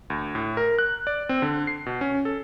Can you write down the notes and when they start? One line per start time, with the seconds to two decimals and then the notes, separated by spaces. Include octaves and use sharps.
0.10 D2
0.35 A2
0.57 A#4
0.79 F#6
1.07 D5
1.29 C4
1.42 D3
1.67 C7
1.86 B2
2.01 C#4
2.25 A4